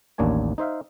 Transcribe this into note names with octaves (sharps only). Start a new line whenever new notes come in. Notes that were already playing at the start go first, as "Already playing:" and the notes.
A1 D#2 A#3 D4 C#5 G#5
D#4 C5 E5 F5